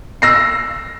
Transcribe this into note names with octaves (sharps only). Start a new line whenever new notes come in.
E6 A#6 C7